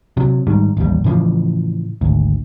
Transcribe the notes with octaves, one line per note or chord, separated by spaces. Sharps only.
C3 F#3
G#2 D#3 G3
A1 D#2 G3
A2 C#3 E3 F3
G#1 D2